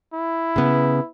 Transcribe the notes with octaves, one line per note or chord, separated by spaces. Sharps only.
E4
C#3 B3